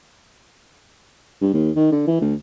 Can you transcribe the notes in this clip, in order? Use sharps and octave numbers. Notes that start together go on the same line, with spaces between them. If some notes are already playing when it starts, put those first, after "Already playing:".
G2
D#2
D#3
D3
E3
D2